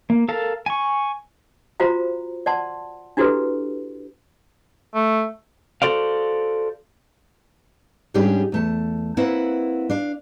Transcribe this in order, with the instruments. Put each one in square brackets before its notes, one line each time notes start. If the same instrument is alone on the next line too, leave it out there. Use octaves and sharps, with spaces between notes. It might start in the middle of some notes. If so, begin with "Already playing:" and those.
[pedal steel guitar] A#3
A4 A#4 F5 A5
G#5 C#6
[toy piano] F4 F#4 C5 F5 A#5
D5 F#5 A5 C6
D4 E4 F#4 G4 A4 B4
[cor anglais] A3
[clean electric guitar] F#4 A4 C5 D5 F5
[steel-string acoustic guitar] G#2 G3 C#4 D4 G4 G#4
E2 A3 A5
A#3 C4 E4 B4 F#5
D4 F5